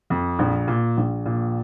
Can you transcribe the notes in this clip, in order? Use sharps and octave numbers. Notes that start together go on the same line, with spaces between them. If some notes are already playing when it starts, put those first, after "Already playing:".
F2
A#1
A#2
A#1
A#2